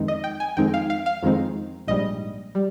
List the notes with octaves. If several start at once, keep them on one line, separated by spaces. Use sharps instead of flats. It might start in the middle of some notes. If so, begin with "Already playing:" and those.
Already playing: F2 D#3 G#3 C4 D#4
D#5
G5
G#5
F2 D#3 G#3 C4 D#4 G5
F5
F5
F5
F2 D#3 G#3 C4 D#4
A#1 G#2 G3 D#5
G3